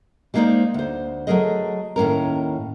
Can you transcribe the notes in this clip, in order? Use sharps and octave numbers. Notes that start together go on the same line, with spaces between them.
G3 G#3 A#3 D#4 C5 D5
D2 C5
F#3 G#3 A3 G#4 A#4 D#5
D#2 A2 C#4 A#4